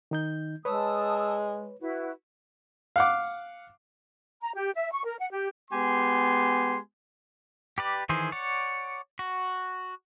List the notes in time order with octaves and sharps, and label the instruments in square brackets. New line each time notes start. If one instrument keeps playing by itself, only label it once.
[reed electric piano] D#3 D#4 G6
[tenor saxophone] G#3 [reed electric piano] B4 C#5 [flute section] A5 D#6 E6
[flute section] E4 F#4 B4
[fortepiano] F5 F#5 D6
[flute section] A#5
G4
E5
C#6
A#4
F#5
G4
[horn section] G#3 B3 G4 G#5 C6
[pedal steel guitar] G4 B4 D5
D#3 E3 G#4 C5
C#5 D5 F#5
F#4